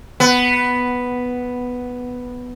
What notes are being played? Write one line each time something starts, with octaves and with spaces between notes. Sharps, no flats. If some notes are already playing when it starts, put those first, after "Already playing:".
B3